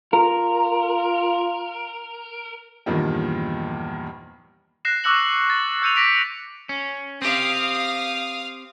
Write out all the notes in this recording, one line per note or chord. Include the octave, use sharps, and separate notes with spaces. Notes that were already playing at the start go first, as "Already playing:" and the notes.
F4 A#4
E2 G2 A#2 D#3 F3
F#6 A#6 C7 E7
C#6 D6 E6 F#6 C#7 F#7
D6 F#7
A6
E6 G6 C#7 D#7 F7
D6 A#6 B6 D7 F7
C#4
C4 G4 F5 D#6